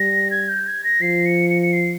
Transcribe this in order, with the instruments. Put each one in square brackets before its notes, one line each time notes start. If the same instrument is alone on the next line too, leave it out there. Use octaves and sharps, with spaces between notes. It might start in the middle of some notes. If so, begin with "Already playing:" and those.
Already playing: [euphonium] G3 [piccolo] A#6
[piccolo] G#6
G6
G#6
A#6
[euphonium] F3 [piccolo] C7
[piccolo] C#7
C#7
C#7
C7